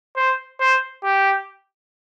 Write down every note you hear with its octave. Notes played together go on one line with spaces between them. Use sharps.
C5
C5
G4